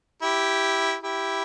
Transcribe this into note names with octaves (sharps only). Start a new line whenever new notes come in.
E4 G4
E4 G4